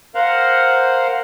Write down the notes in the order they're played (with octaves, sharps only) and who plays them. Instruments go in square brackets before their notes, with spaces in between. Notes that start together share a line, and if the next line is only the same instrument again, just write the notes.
[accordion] A#4 C5 F5 F#5